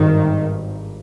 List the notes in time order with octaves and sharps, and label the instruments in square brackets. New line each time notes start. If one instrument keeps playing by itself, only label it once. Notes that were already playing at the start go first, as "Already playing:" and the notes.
Already playing: [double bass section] G#1 G2 D#3